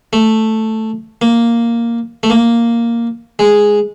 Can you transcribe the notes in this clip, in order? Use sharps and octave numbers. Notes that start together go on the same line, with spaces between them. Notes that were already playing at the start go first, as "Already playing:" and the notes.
A3
A#3
A3
A#3
G#3